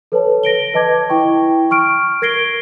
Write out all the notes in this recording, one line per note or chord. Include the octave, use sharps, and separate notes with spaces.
A4 B4 C#5 A5
A#6 D7 G7
B4 D#5 A5 D6 G#6
E4 G5 C#6
C#6 F6 D7
A#4 G#6 A#6 C7 D7 G7